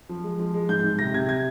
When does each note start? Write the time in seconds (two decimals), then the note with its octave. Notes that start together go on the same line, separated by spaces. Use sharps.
0.09 F3
0.24 G#3
0.39 F3
0.54 G#3
0.69 G#2 G6
0.84 G#2
0.99 C3 A#6
1.14 C3 G#6
1.29 G#6